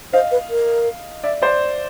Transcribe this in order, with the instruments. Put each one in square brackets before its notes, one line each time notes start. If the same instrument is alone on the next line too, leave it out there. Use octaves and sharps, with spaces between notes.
[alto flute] C5 [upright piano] D#5 F5
[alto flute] B4
A#4
[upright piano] D5 E5
C5 D5